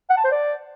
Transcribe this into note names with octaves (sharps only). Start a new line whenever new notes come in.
F#5
A5
C5
D5